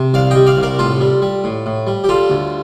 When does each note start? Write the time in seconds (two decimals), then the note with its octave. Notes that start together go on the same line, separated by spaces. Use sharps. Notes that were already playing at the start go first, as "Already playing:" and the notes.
Already playing: C3
0.14 C2 D5 F5
0.31 G3 D#5 G5
0.47 D5 F5
0.57 C2
0.63 A#4 D5
0.79 A2 F4 A4
1.01 G3
1.22 G3
1.44 A2
1.66 A2
1.87 G3
2.04 G4
2.09 G3 F4 A4
2.30 D2